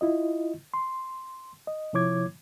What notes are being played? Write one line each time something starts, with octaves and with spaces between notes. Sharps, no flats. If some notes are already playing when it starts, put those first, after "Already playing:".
E4 F4 D#5
C6
D#5
C3 F3 E4 C#5 D6 G#6